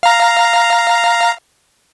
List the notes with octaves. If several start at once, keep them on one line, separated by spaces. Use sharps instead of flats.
F5 A#5